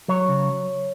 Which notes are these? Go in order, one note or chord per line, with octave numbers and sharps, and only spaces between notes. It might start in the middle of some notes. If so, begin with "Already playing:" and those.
F#3 C#5
C#3